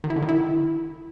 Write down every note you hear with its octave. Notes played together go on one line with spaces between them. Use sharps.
D#3
E4
D3
D#3
E4